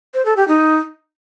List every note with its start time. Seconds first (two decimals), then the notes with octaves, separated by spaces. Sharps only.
0.14 C5
0.25 A4
0.37 G4
0.48 D#4